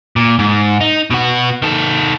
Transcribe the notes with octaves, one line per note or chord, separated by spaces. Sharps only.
A#2
G#2
D#4
B2 F#4
D#3 A4